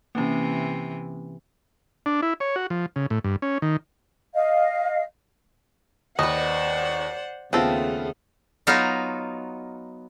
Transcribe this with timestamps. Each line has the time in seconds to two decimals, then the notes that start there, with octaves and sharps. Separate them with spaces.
0.15 C3 E3 A#3 C#4
2.06 D4
2.22 E4
2.40 C#5
2.56 F#4
2.70 F3
2.96 C#3
3.10 A2
3.24 G2
3.42 C#4
3.62 D#3
4.34 D#5 F5
6.19 D#2 B4 C5 D5 D#5 F#5
7.53 D#2 C#3 A3 B3 C4 F4 A4
8.67 F#3 B3 D#4 F4 A#4